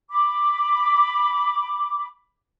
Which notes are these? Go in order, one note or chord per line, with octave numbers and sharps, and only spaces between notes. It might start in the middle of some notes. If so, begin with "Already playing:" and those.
B5 D6